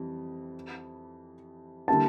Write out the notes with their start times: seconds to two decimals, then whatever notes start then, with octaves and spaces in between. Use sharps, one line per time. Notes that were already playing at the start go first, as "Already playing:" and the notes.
Already playing: F2 E3 G3
1.88 D3 G3 A#3 E4 A5